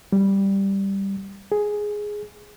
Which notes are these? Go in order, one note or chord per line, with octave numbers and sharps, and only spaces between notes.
G3
G#4